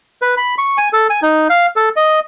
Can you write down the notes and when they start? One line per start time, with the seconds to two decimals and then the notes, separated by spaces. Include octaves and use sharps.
0.22 B4
0.37 B5
0.58 C#6
0.78 G#5
0.93 A4
1.10 G#5
1.22 D#4
1.50 F5
1.76 A4
1.96 D#5